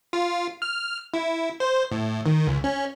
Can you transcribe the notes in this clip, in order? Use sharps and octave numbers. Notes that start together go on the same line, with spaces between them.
F4
F6
E4
C5
A2
D#3
C#2
C#4